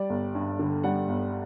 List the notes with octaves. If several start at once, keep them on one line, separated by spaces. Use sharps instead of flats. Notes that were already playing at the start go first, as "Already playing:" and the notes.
Already playing: G3 D5
G1
G2
D3
G3 F#5
G1